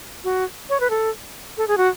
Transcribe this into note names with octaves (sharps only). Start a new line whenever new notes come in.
F#4
C#5
B4
A4
A4
G#4
F#4